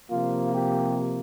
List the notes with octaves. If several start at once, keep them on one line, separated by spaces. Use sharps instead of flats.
C3 F3 A#3 F4
G4